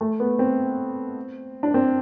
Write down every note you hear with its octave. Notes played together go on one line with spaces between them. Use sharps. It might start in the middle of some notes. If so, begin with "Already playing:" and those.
A3
B3
C4
D4
C4